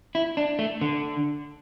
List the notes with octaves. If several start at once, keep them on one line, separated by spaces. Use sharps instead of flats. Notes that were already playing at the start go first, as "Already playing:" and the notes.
E4
D4
A3
D3